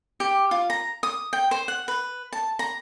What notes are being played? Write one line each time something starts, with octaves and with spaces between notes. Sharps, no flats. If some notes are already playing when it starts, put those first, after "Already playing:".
G4
F4
A#5
D#6
G5
C5
F#5
B4
A5
A#5